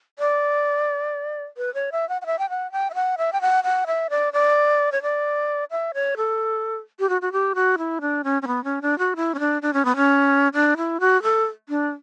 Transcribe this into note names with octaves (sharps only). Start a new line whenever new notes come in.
D5
B4
C#5
E5
F#5
F#5
E5
G5
F#5
G5
E5
F#5
E5
G5
F#5
F#5
E5
D5
D5
C#5
D5
E5
C#5
A4
G4
F#4
F#4
G4
F#4
E4
D4
C#4
C#4
B3
C#4
D4
F#4
E4
C#4
D4
D4
C#4
B3
C#4
D4
E4
F#4
A4
D4